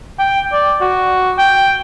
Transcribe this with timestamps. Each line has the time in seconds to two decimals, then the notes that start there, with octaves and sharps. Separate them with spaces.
0.19 G5
0.52 D5
0.81 F#4
1.38 G5